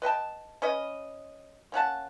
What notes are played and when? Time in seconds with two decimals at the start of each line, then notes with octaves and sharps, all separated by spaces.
0.02 B4 D#5 G5 A5
0.62 C#4 B4 D#5
1.72 A#3 C#4 F#5 A5